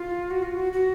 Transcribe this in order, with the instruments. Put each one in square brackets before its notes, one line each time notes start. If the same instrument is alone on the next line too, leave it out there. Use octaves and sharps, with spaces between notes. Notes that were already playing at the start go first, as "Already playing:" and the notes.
Already playing: [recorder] F4
F#4
F4
F#4
F#4